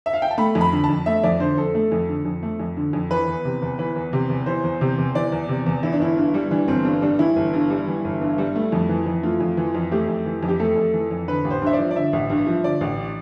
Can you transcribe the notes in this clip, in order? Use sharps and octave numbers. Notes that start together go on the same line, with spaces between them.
E5
F5
G5
A5
A3 B5
F2
B5
D3
A5
F2
A3 E5
F2 D5
D3 C5
F2 A4
A3
F2
D3
F2
A3
F2
D3
F2
E3 B4
E2
C3
E2
E3 B4
E2
C3
E2
E3 C5
E2
C3
E2
E3 D5
E2
C3
E2
E3 E4
D4
G1 E4
G2
G3
E3 D4
G1 C4
G2 D4
G3 D4
E3 E4
G1
G2
G3
E3
G1
G2
G3
A3
F2
E3
F2
A3 F4
F2
E3
F2
A3 G4
F2
E3
F2
G4
A3 A4
F2
E3
F2
D3 B4
A1
C5
G2 E5
D5
F3
D5
D3 E5
A1
G2
F3
D3 D5
A1